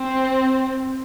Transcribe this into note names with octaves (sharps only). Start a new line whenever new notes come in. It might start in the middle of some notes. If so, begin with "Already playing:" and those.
Already playing: C4